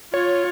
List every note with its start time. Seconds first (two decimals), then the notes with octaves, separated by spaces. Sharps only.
0.14 F4 C#5